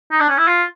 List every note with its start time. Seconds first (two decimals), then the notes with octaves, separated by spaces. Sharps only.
0.12 D#4
0.21 D4
0.29 C#4
0.38 E4
0.48 F4